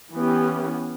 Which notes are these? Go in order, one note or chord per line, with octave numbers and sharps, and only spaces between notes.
E3 B3 C#4 G4